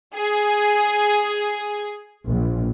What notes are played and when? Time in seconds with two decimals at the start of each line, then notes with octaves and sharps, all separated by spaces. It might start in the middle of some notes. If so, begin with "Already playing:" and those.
0.16 G#4
2.25 A#1